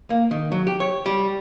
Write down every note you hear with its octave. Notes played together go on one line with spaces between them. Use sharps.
A#3
D#3
F#3
G4
C#5
G3